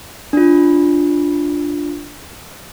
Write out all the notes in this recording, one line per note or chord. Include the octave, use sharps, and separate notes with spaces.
D4 F4